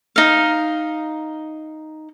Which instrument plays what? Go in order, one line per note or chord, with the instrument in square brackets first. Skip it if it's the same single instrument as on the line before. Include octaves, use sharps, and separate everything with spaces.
[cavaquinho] D#4 F5